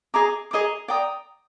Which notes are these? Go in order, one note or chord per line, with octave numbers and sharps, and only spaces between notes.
G#4 D#5 A#5 D6
G#4 D#5 A#5 D6
D5 G5 A#5 D#6